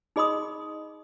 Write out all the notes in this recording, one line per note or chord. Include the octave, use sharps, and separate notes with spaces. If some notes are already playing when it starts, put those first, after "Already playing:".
D#4 G#4 D#5 B5 C6 D#6